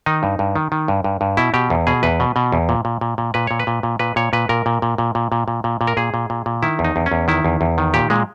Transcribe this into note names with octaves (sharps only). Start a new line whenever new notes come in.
D#3 D#4
G2
G2
D#3
D#3
G2
G2
G2
B2 E4
B2 G4
E2
B2 G#4
E2 B4
B2
B2
E2
A#2
A#2
A#2
A#2
A#2 B4
A#2 C#5
B4
A#2
A#2
A#2 B4
A#2 C#5
A#2 B4
A#2 A#4
A#2
A#2
A#2
A#2
A#2
A#2
A#2
A#2
A#4
A#2 G#4
A#2
A#2
A#2
D#3 E4
E2
D#4
E2
C#4
E2
D#3 E4
E2
E2
D#3
A#2 G4
A#2 G#3